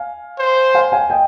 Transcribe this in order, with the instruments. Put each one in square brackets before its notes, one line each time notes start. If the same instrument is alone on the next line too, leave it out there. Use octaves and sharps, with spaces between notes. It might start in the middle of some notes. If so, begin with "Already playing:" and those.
Already playing: [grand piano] F5 G#5
[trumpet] C5
[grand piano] F5 G#5
F5 G#5
D#5 G5